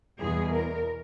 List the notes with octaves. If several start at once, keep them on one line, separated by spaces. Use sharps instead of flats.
E2 B2 G3 G#4
A#4